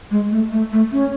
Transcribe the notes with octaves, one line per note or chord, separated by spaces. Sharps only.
G#3
A3
A3
A3
C#4